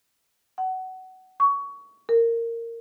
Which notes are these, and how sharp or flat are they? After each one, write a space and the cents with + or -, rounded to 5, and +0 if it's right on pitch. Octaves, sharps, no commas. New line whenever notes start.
F#5 +20
C#6 +20
A#4 -15